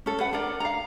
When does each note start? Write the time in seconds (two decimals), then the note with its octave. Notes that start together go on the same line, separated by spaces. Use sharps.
0.06 C#4 A4
0.20 B4 F#5
0.33 D4 A4 A#4 D5
0.60 F5 A#5